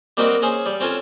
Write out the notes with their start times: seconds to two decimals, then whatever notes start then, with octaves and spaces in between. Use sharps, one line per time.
0.17 G3 A#3 C4 D#4 F#4 G4
0.42 C#4 G#4 C5 C#5
0.66 G3
0.80 C4 C#4 F4 A4 G#5